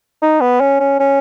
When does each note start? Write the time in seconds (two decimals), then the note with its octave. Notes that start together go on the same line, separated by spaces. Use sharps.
0.22 D#4
0.41 B3
0.60 C#4
0.80 C#4
0.99 C#4